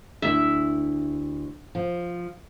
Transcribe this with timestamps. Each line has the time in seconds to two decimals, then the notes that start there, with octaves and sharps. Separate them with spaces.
0.22 D2 E4 E5
1.75 F3